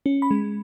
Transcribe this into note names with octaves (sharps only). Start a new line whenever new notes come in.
C#4
B5
G#3